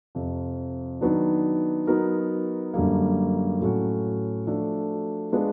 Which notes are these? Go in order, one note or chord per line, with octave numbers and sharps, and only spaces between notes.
F2 C3 F3
D#3 F#3 B3 D4
F#3 B3 D#4 F#4 A#4
F#2 D3 G3 A#3
A2 F#3 A3 C#4 F#4
F3 A3 D4 F#4 A4
G#3 B3 D4 F4